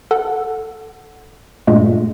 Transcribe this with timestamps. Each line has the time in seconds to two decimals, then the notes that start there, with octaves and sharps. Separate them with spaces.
0.11 A4 F#5
1.67 G2 A#2 G#3 A3